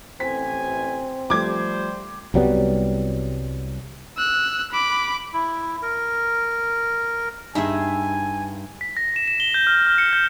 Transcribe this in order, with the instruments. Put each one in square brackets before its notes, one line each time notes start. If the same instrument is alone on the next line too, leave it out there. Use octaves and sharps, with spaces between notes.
[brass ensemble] A1 G#5 [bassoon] C4 [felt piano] B6
[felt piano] F3 A3 [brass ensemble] G3 C5 [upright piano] D6 G#6
[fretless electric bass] C2 F#3 G3 B3
[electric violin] E6 F#6
B5 D6
[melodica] E4
A#4
[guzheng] G2 E5 [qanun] D#4 G#4 [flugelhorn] G#5
[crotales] B6
A#6
E7
E7
G7
G6
F6
F6
C#7
G6